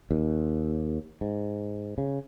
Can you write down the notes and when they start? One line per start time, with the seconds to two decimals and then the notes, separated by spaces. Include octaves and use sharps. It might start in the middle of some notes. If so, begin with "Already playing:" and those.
0.11 D#2
1.21 G#2
1.98 C#3